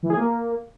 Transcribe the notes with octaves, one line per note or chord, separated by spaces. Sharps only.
E3
G#4
A#3